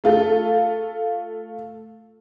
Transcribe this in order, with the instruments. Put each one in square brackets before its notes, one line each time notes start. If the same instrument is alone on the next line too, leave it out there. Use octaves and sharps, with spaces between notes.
[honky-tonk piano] A3 F4 A4